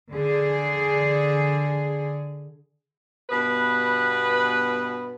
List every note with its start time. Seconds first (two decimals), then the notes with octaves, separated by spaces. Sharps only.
0.13 D3 G#4
3.30 G2 B2 B3 B4